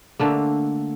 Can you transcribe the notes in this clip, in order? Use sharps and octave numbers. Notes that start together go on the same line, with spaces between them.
D3 A3 A#3